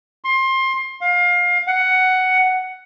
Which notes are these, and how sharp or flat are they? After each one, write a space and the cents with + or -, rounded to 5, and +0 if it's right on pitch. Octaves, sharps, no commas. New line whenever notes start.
C6 +25
F5 +25
F#5 +10